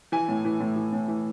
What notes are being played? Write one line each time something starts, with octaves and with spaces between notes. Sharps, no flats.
E3 G#5
A2
E3
A2
E3
A2
E3